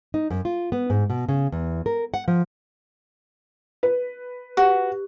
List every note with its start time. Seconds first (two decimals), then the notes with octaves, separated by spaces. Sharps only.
0.14 D#4
0.30 F#2
0.45 F4
0.72 B3
0.90 G#2
1.10 B2
1.29 C#3
1.52 E2
1.86 A#4
2.14 F#5
2.28 F3
3.83 B4
4.57 F#4 G4